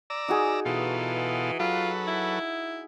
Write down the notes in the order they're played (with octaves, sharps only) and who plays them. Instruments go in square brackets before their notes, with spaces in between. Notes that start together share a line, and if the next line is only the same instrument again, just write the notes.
[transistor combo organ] D5 A#5 E6
[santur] D#4 F#4 G#4
[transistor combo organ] B2 F4 A4 [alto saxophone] E3
[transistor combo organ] F#3 A4 B4 [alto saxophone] F4
[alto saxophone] E4